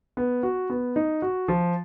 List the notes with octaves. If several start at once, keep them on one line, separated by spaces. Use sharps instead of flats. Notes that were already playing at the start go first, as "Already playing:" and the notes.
B3
F#4
B3
D#4
F#4
F3